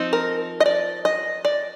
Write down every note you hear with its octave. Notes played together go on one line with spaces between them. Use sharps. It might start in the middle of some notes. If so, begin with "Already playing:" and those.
Already playing: F3 C4 D#4
A#4
D#5
D5
D#5
D5